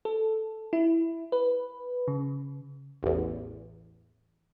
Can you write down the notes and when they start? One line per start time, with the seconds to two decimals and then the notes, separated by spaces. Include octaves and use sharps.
0.05 A4
0.73 E4
1.32 B4
2.08 C#3
3.03 A1 E2